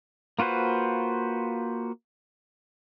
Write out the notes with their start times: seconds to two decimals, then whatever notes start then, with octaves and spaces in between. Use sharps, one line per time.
0.39 A#3 F4 F#4 B4 C5